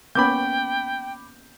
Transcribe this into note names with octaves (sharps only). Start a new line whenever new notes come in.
A#3 B3 C#4 G5 B5 D6 G6